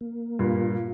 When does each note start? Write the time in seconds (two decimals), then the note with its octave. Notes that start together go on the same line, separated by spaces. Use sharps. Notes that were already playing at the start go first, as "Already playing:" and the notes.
0.01 A#3
0.39 G2 A#2 F4